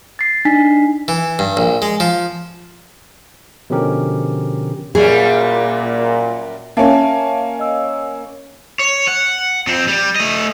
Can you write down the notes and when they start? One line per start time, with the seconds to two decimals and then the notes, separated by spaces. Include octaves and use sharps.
0.19 A6 C7
0.45 D4 D#4 G#5 B6
1.08 E3
1.39 G2
1.57 A#1
1.82 G#3
2.00 F3
3.70 B2 D3 F3 C#4 G4 A#4
4.95 F#2 A#2 F#3 G3 G#4
6.77 A#3 C#4 E5 A5
7.59 D#5 E6
8.79 C#5
9.08 F#5
9.67 F2 C4
9.88 G3
10.16 A3 D#5